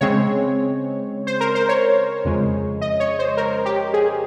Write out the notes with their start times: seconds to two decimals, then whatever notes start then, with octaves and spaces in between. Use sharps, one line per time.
0.01 C#3 G#3 C4 C#5
1.27 C5
1.40 A#4
1.55 C5
1.69 C#5
2.25 F2 C#3 G#3
2.81 D#5
3.00 C#5
3.19 C5
3.37 A#4
3.65 G4
3.94 G#4